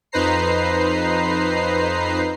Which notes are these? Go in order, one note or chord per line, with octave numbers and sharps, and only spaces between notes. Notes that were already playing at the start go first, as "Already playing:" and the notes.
F2 D#4 B4 C5 A#5 C7